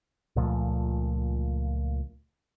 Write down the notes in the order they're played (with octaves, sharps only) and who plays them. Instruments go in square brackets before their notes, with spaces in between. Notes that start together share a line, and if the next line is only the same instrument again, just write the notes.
[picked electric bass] C#2 A#2 F3 A3